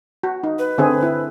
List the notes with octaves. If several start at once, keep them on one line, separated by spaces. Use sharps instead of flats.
F#4
D#4
B4
D3 C4 G#4
E4